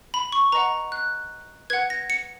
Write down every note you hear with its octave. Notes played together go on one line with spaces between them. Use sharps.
B5
C#6
B4 D#5 F#5 A#5
F#6
B4 F#5 G#6
A#6
C#7